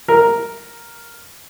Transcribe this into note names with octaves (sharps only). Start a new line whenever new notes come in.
A#4